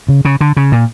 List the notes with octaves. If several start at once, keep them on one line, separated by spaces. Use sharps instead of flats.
C#3
C#3
D3
C#3
A#2